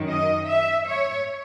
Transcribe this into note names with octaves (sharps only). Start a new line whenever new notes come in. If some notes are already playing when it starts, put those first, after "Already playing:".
Already playing: F#2 D#3
D#5
E5
C#5